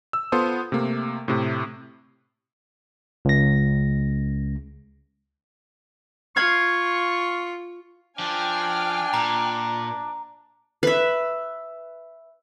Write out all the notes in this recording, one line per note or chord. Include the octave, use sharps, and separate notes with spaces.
E6
B3 F4 A4 C5 D#6
C3 A3 A#3
A2 C3
C#2 A#6
F4 C#6 F6 G#6 C7
F3 D4 G5 G#5 F6
A#2 A#5
B4 E5